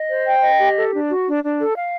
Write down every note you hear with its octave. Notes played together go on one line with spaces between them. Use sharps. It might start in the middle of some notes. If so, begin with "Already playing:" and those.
Already playing: D#5
C5
G5
D#5
G4
A4
D4
F#4
D4
D4
A4
F5